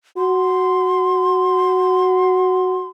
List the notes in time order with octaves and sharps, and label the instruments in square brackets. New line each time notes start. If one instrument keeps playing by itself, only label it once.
[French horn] F#4 [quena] C6